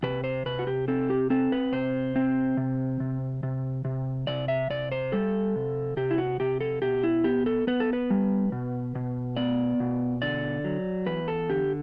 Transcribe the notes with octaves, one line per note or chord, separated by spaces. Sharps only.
C3 B4
C5
C3 B4
F#4
G4
C4 A4
G4
C4 A4
B4
C3 C5
C4
C3
C3
C3
C3
C3 D5
E5
C3 D5
C5
G3 A4
C3
C3 G4
E4
F#4
C3 G4
A4
B2 G4
E4
B3 G4
A4
B3 B4
A4
B4
G3
B2
B2
B3 D5
B2
D3 D5
F#3
E2 B4
A4
D3 G4